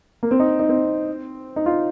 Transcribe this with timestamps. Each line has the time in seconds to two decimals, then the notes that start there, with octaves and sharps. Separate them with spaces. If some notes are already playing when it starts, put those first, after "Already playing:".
0.23 A#3
0.31 C4
0.40 D#4
0.59 D#4
0.69 C4
1.56 D#4
1.66 F4